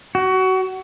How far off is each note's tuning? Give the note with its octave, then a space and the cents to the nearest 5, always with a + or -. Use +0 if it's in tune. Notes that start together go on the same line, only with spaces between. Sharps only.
F#4 +25